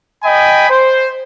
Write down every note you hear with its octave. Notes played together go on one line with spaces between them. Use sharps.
D#5 G5 G#5 B5
C5